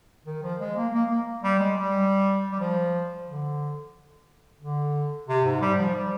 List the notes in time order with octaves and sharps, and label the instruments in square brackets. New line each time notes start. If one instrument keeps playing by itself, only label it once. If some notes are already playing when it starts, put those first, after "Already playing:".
[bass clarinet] D#3
F3
G#3
A#3
A#3
A#3
G3
G#3
G3
G3
F3
D3
D3
C3
G#2
G3
F3
G3